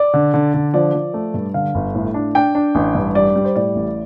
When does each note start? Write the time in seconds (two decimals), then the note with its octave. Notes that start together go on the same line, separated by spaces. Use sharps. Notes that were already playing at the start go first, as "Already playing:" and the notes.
Already playing: D5
0.14 D3
0.34 D3
0.54 D3
0.74 F3 D5
0.94 F3
1.14 A3
1.34 G2
1.54 D3 F5
1.75 G1
1.95 A2
2.14 D4
2.35 D4 G5
2.55 D4
2.75 A1
2.95 G2
3.15 G3 D5
3.36 G3
3.44 C5
3.56 A2 D5
3.76 A1